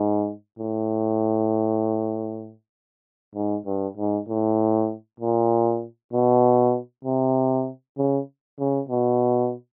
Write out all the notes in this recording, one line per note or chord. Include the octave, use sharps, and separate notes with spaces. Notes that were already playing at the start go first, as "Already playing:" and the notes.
Already playing: G#2
A2
G#2
G2
G#2
A2
A#2
B2
C3
C#3
C#3
B2